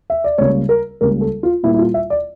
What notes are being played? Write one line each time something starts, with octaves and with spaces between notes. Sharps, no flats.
E5
D5
C#2 C#3 G3 A#3 C#5
A#4
C#2 C#3 G3 A#3 A#4
A4
F4
A#2 G3 A#3 E4
E4
F4
E5
D5